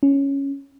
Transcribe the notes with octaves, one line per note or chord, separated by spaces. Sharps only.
C#4